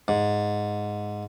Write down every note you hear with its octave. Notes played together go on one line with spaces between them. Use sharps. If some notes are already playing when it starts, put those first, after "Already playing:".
G#2